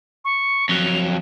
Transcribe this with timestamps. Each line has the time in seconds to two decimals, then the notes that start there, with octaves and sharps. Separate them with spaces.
0.25 C#6
0.69 F2 F#3 F7